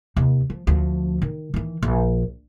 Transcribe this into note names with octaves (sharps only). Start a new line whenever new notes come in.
D#2 C3
F3
D2 F3
D#3
D#3 E3
A#1